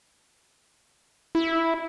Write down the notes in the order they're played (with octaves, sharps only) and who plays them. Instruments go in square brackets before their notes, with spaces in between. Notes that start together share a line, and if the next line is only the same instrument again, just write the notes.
[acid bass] E4